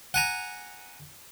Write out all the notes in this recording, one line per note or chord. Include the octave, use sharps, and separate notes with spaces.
F#5 G#5 A#5